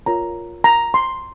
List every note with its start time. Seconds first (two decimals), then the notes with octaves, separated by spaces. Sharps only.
0.06 F4 A#4 C#5 A#5
0.64 A#5
0.94 C6